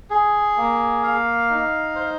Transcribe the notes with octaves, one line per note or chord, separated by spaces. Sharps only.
G#4
A#3
F5
D#4
C5